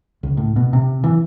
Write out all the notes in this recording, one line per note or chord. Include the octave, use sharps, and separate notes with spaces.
C#2
A2
B2
C3
E3